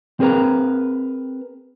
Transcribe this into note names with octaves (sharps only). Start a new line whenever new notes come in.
C4 G#4 A#4 B4 A#5